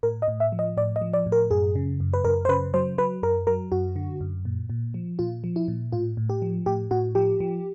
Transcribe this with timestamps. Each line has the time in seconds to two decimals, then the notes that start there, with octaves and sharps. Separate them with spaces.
0.03 A2 A#4
0.22 D#5
0.28 A2
0.40 E5
0.52 F3
0.59 D#5
0.77 A2 D5
0.96 D#5
1.01 F3
1.13 D5
1.26 A2
1.32 A#4
1.51 F#2 G#4
1.75 C#3
2.00 F#2
2.13 B4
2.25 F#2 A#4
2.45 C5
2.49 C#3 B4
2.74 F#3 C5
2.98 F#3 B4
3.23 F#2 A#4
3.47 F#3 A#4
3.72 F#2 F#4
3.96 D3
4.21 F#2
4.45 A#2
4.70 A#2
4.94 F3
5.19 A#2 F4
5.44 F3
5.56 E4
5.68 A#2
5.92 A2 F4
6.17 A2
6.30 G4
6.42 F3
6.66 A2 G4
6.91 A2 F#4
7.15 F3 G4
7.40 F3